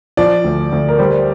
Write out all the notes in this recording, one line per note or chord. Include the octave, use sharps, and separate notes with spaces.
F3 D5
D2
D2
A#4
G3 C5